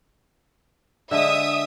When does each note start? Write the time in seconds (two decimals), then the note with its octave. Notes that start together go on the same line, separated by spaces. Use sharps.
1.11 D3 G#3 E5 D#6